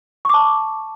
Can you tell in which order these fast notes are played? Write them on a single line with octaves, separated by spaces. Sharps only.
C#6 D6 A5